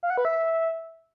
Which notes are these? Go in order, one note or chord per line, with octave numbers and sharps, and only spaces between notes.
F5
F#5
B4
E5